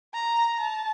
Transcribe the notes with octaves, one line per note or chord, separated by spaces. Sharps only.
A#5
A5